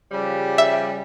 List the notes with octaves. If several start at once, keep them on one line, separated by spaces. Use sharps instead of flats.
C#3 F3 G3
E5